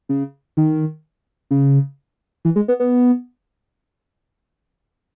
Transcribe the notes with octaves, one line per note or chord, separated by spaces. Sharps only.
C#3
D#3
C#3
E3
G#3
B3
B3